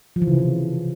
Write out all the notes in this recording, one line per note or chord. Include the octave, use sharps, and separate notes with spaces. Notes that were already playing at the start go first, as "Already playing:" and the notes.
F3
E3
C#3
C3
E3